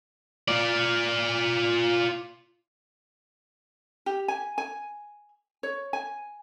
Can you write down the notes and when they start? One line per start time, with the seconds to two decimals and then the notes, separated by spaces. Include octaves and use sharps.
0.48 F4 D5
4.06 G4
4.28 G#5
4.58 G#5
5.63 C#5
5.93 G#5